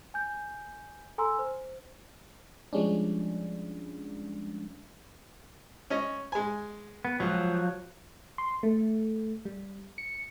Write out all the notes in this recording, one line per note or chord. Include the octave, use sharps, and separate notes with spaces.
G#5 G6
A4 G#5 A#5 C6 E6
C5
F3 G3 G#3 C#4 D4
C#4 D#5
G#3 G#5
B3
C#2 F3 F#3
C6
A3
G3
C#7